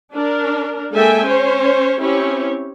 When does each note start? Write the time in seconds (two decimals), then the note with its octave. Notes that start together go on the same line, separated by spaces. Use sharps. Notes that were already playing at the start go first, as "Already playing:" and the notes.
0.13 D4 A#4
0.93 G#3 A#3 A4 E5 G5 G#5
1.26 C#4 C5 C#5
2.01 C4 C#4 E4 G4 C#5